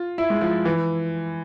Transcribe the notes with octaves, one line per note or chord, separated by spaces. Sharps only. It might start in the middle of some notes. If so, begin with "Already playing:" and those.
Already playing: F4
E4
G#3
F3
E3